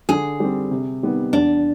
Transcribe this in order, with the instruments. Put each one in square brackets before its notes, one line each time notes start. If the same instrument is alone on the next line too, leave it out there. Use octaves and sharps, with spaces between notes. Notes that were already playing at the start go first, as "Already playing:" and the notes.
[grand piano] D3 [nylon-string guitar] G#4
[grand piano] G3 C4
C3
D#3 G3 B3
[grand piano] E2 [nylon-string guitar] D4